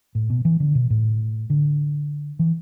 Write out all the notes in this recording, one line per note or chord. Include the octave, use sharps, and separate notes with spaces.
A2
B2
E3
D3
B2
A2
D3
E3